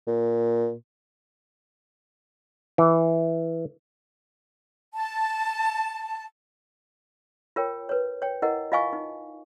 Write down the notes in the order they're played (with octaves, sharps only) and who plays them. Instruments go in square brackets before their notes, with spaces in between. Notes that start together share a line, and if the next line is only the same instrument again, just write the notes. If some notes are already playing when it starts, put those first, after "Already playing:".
[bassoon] A#2
[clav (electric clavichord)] E3
[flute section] A5
[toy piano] F4 A#4 C#5 G5
B4 C#5
C#5 G5
E4 A#4 D#5 F#5
F4 D#5 F5 G#5 C#6
D#4